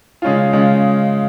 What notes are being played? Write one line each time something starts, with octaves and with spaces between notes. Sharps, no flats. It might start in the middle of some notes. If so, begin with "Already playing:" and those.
C#3 G#3 C#4 F4
C#3 G#3 C#4 F4